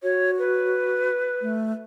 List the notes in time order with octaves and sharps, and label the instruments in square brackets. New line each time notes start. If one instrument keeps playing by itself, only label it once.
[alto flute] F#4 [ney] C#5
[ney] B4
[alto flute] A3